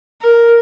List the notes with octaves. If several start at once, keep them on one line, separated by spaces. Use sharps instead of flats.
A#4